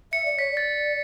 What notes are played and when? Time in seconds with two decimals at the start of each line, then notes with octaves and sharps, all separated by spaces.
0.12 E5 C#7
0.25 D5
0.39 C#5 B6
0.52 D5
0.57 A6